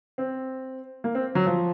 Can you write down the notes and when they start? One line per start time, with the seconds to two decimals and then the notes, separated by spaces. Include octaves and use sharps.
0.18 C4
1.04 A#3
1.15 C4
1.35 F#3
1.46 F3